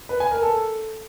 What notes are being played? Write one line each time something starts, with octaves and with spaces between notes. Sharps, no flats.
B4
G#5
A#4
A4